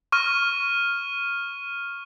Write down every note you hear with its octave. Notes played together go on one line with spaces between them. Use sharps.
C#6 F6 D#7